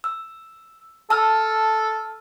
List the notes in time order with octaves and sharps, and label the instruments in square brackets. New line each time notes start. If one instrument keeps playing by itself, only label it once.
[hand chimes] E6
[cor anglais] A4 [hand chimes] A5 E6 F6